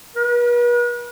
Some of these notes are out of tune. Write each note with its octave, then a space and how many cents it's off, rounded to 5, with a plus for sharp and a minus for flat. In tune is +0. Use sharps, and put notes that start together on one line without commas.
B4 -40